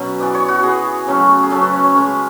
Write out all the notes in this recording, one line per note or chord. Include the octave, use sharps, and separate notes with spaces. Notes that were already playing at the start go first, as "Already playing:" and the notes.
Already playing: B2 F#3 C#4 B4
E3 B3 D5
C#5
F#4
E3 B3 G#4
C#3 F#3 A3 C#4
G#4
C#3 F#3 A3 C#4 A4
B4
C#5
C#5
C#3 G#3 C#4